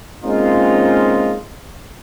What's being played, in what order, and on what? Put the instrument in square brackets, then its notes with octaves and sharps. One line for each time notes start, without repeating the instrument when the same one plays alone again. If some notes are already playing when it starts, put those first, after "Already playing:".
[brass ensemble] G#3 A#3 C4 C#4 D#4 F4